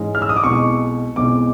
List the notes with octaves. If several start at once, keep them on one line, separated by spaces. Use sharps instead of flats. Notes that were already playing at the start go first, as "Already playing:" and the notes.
Already playing: G#2 E3 G#3 C#4
F6
E6
D#6
D6
B1 B2 G#3 C4 E4 C#6
B1 B2 G#3 C4 E4 D6